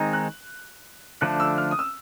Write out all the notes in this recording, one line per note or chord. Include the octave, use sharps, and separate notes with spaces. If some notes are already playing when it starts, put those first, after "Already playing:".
Already playing: D#3 G#3 C4 D#4
F#6
D3 F3 A3 D4 F#6
E6
F6
D#6
E6